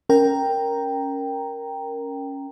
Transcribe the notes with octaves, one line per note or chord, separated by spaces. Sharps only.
C#4 A#4 G5 A#5